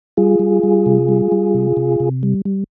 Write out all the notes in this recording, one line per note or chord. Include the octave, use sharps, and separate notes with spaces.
G3 F4 G#4
G3
G3
C3
G3
G3
C3
C3
C3
G3
G3